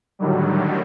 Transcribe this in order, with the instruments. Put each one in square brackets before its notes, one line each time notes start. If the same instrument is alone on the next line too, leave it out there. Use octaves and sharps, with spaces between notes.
[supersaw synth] A2 D3 D#3 F#3 G3